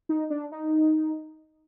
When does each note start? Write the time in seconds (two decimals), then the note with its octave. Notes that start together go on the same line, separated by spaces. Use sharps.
0.09 D#4
0.30 D4
0.52 D#4